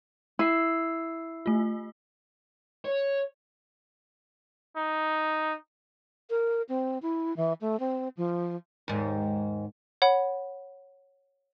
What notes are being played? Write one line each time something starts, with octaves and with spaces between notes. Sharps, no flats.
E4 E6 C7
A3 F4
C#5
D#4
A#4
C4
E4
E3
A3
C4
F3
D#2 G#2
C#5 F#5 B5